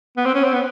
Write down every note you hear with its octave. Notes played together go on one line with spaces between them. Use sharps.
B3
C4
C#4
C4
B3